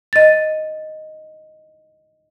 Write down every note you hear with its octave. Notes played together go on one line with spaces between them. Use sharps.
D#5 A6